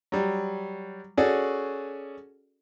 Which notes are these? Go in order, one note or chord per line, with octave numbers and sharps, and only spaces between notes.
F#3 G3
C#4 F#4 G#4 A4 D5